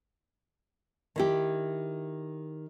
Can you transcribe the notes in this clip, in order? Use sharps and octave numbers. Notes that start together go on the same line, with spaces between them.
D#3 E4 G4